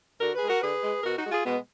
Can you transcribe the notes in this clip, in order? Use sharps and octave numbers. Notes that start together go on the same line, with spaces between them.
D3 F#4 A#4
G#4 B4
G#3
F#4 A#4
D3 G#4 B4
G#3
B2 F#4 A#4
D#4 F#4
G#3
F4 G#4
B2 G#3 B3